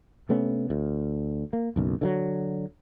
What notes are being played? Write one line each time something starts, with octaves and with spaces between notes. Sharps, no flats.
C3 A3 B3 C#4
D2
A#3
F#1 B1 F#2
D3 E3 F#3